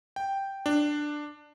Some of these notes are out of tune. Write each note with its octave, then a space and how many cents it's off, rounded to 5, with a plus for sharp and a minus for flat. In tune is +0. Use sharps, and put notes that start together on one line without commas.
G5 +0
D4 +10